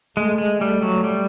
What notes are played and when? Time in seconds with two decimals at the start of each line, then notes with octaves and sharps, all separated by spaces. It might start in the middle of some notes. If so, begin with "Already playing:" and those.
0.17 G#3 A3
0.38 G#3
0.61 G3 A3
0.82 F#3
1.04 G3